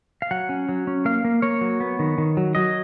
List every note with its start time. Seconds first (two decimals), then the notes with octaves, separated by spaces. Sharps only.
0.22 F5
0.31 F#3 F#5
0.49 C#4
0.69 F#3
0.87 C#4
1.05 A#3 F5
1.25 A#3
1.42 A#3 C#5
1.61 F#3
1.80 B3
1.99 D#3
2.18 D#3
2.37 F#3
2.55 F#3 D#5